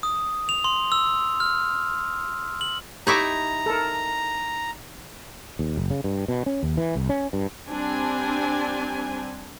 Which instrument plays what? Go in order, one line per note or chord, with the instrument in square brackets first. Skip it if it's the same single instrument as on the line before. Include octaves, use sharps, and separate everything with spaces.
[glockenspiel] D#6
F7
C6
E6
F6
F#7
[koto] D#4 E4 E5 [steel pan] G4 C#6 D6 [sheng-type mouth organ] A#5
[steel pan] A4 A#4
[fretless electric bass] D#2
F#1
C#3
G2
B2
C#4
D#2
E3
C2
C#4
G2
[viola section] G3 C4 D4 G#5